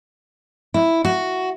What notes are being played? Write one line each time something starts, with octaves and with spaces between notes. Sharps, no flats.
E4
F#4